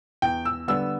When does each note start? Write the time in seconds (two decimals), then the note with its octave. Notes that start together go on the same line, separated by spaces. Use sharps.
0.22 E2 G5
0.45 E6
0.68 D3 G3 B3 E6